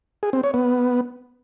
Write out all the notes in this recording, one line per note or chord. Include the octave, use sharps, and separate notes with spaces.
G#4
C4
C#5
B3